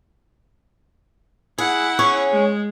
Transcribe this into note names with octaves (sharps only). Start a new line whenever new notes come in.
E4 G#4 F#5
C#4 G#4 C#5
G#3